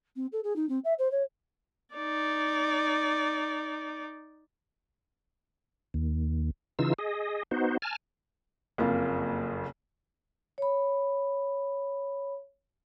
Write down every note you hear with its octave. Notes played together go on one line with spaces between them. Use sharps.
C4
A4
G#4
D#4
C4
E5
C5
C#5
D#4 D5
D#2
C#3 E3 D#4 F4 E6
G#4 D#5
B3 D#4 F#4 C5
G#5 A5 F6
F#1 F2 A#3 F4
C#5 B5